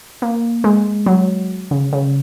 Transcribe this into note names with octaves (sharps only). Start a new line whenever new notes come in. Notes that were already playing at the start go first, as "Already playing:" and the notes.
A#3
G#3
F#3
C#3
C#3